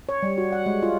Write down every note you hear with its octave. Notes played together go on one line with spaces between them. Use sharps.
C#5
G3
F#4
F#5
G#3
F4